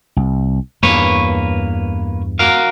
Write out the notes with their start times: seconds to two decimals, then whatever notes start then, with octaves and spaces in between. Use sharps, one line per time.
0.17 C2
0.83 E2 G2 A#3 B4 C#5
2.39 F#4 A#4 F5